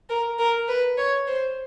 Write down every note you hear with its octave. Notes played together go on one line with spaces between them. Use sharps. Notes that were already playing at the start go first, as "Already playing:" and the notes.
A#4
A#4
B4
C#5
C5